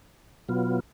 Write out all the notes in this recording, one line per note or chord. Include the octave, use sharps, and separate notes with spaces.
B2 F#3 B3 F4